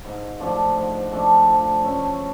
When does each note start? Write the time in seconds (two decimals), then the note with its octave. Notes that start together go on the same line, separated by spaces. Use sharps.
0.05 G#2
0.40 F3 A3 D4
0.77 G#2
1.12 F3 A3 D4
1.47 F3
1.84 A3 C#4